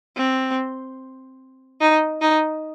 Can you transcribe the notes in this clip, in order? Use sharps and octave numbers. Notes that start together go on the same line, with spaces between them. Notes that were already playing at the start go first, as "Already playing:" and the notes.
C4
D#4
D#4